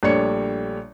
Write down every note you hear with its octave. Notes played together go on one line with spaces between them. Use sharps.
A#1 G3 A3 D4 C#5 C#7